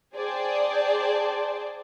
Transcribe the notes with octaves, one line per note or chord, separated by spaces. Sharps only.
G#4 C5 D5 G5 A5